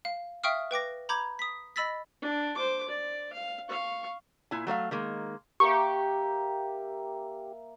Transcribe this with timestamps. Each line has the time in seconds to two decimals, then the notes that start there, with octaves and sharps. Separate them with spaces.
0.05 F5
0.44 E5 F5 G5 C#6 D#6 F6
0.71 B4 G5 D6 A#6
1.09 A#5 B5 D6 G6 G#6
1.39 D#6 B6
1.76 D#5 B5 E6 A6 B6
2.22 D4
2.55 C5 D6
2.88 D5
3.33 F5
3.69 F5 C#6
4.51 A#2 E4 G#5
4.67 F#3 A3 C5 F5
4.91 D#3 G#3 A#3
5.60 A#3 G4 E5 C#6